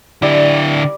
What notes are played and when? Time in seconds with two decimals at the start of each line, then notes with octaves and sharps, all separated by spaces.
0.22 D3 G3 E4 D5 G5